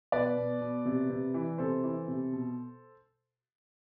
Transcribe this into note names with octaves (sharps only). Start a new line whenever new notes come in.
B2 B4 D5
B2
B2
C3
C3
E3
C3 A4 C5
E3
C3
B2